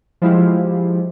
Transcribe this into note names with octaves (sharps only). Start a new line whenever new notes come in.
F3 G#3 E4 F4 G4